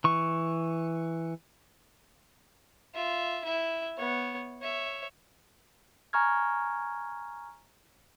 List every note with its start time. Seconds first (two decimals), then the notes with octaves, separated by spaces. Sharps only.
0.04 E3 C#6
2.95 F4 E5
3.44 E4 E5
3.98 B3 C#5
4.62 C#5 E5
6.13 G#5 A#5 C#6 F6 G#6